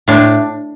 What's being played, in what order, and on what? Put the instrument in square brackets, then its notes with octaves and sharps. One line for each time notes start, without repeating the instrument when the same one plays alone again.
[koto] A2 D4